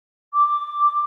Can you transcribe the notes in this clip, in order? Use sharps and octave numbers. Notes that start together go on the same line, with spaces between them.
D6